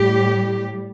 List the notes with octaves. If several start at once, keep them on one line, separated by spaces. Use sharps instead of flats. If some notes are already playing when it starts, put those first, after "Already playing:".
Already playing: A2 G3 G4